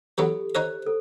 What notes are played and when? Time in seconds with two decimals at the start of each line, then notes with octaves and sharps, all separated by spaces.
0.18 E3 F#3 B3 G4 A4
0.55 D#4 C5 C#5 D#5
0.87 A4